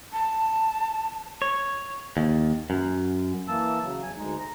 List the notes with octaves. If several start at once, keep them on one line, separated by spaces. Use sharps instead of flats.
A5
C#5
D#2
F#2
E3 A#3 A5 E6
C#3 F#3
E2 G#5
D2 G#3 D#4
A#5